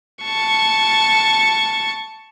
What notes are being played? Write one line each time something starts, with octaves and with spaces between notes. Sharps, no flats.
A5 C#6